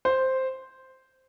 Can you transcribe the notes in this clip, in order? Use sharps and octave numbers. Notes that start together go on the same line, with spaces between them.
C5